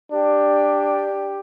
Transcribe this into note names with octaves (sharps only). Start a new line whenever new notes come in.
D4 G4